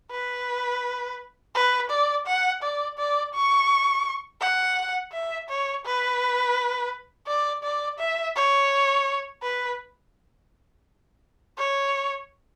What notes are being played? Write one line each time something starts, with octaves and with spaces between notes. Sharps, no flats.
B4
B4
D5
F#5
D5
D5
C#6
F#5
E5
C#5
B4
D5
D5
E5
C#5
B4
C#5